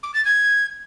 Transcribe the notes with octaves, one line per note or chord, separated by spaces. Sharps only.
D6
A6
G#6